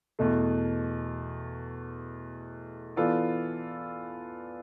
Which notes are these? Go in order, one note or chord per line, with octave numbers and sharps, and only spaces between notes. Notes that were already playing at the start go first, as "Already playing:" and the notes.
E2 B2 A3
E3 B3 F4 A4 D5